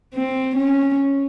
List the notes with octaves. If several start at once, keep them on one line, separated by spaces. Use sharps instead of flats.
C4
C#4